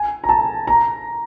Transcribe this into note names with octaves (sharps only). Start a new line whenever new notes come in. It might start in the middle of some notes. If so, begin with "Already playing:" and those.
Already playing: G#5
A#5
A5
A#5